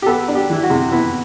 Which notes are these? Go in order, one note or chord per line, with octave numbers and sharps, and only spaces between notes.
G4
B3 A4
D4
G4
E3 E4
F#4
C3
B3 E4